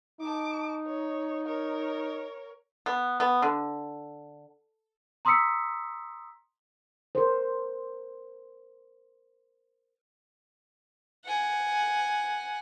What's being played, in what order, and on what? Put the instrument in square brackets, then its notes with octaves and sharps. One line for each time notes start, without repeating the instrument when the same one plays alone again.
[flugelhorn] D#4 [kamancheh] A5 D6
[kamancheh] C#5
A#4 C#5
[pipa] B3
B3
D3
[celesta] A#5 C6 D#6 E6 B6 C#7
[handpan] A#4 C5
[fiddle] F#5 G#5